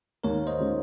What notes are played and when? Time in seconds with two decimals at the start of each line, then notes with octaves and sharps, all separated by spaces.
0.24 D#2 A#4 C#5
0.47 C5 D#5
0.59 D#3 G#3 C#4 F4